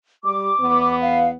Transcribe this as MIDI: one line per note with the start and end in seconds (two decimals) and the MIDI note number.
0.24 0.51 55
0.24 0.96 86
0.61 1.37 40
0.61 1.37 59
1.02 1.29 77